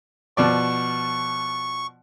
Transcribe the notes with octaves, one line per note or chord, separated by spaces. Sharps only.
B2 F3 D5 C#6